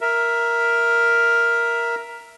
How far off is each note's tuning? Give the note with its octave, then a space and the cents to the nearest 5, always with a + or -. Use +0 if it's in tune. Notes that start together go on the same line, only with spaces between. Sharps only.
A#4 +5 E5 +0